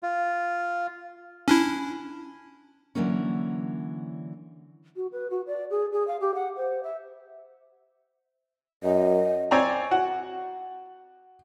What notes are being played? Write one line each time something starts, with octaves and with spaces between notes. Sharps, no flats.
F4
C#4 D4 E4
D3 E3 F#3 A#3 C#4
F#4
B4
F#4
D5
G#4
G#4
F5
G4
F#5
C5
E5
F#2 D#5
C4 C#5 D5 G#5 A#5
F#4 F#5